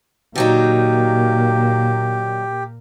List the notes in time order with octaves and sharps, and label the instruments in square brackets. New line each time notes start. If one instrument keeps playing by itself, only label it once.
[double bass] A#2 A#3 [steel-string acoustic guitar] D3 F#3 D#4 [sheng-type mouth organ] G4